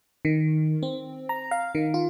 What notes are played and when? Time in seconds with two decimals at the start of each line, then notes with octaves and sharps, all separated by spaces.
0.25 D#3
0.83 C4
1.29 A#5
1.51 F5
1.75 D#3
1.94 F4